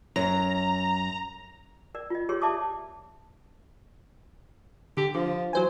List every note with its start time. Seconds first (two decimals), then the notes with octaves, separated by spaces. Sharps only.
0.16 F#2 A#5
1.95 A#4 D5
2.10 F4 D#5
2.29 G4 G#4 A#4 C#5 C6
2.41 D5 E5 A5 C6 D6 D#6
4.97 D3 G4
5.15 D3 F3
5.53 E3 F#3 C5 G#5